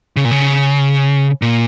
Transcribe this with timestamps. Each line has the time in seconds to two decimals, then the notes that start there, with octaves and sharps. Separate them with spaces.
0.17 C#3
0.25 A#2
0.31 C#3
1.42 A#2